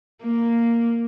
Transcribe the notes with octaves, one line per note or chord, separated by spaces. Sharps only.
A#3